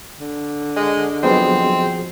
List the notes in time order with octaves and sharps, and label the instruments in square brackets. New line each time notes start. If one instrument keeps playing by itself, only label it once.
[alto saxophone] D3
[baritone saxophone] G#3 [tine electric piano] D#5
[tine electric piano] F3 F#4 G#4 [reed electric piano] F#3 B3 D#5 [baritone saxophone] C4